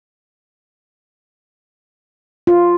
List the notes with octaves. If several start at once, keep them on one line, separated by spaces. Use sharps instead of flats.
F4